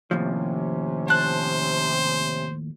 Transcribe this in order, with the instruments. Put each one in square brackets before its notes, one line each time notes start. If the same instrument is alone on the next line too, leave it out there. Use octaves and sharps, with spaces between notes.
[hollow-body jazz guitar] D#2 A2 F3 [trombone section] C3 C#4
[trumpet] C5 [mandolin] A5 F#6